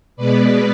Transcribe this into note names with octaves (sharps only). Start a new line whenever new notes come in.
B2 G#3 B3 B4 D5